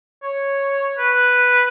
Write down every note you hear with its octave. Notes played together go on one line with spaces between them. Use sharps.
C#5
B4